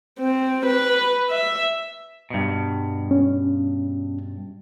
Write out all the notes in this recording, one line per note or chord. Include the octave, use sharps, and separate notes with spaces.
C4
B4
E5
G2 B2
C#4